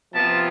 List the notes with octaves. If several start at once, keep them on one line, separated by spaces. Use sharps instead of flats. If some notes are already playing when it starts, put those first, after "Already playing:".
C3 F3 B3 F4 A5